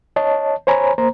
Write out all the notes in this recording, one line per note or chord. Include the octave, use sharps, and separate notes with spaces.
C#5 D#5 A5
C5 C#5 G#5 A#5 B5
A#3 C5 A#5